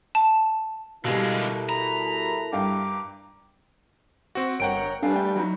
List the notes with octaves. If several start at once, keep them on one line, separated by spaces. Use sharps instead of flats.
A5
B2 D3 G3 G#3 E4 A4 A#4 F5
A#5 B5
G2 F5 G5 D6
C4 F#4
G1 A#4 C#5 F#5 G5 D7
G3 D4 A4 B4 F5 G#5
A3 G5
F#3 D#4 E4 B5